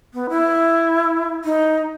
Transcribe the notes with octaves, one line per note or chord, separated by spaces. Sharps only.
B3
E4
D#4